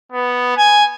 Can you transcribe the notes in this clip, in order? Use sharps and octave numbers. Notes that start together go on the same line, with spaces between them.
B3
G#5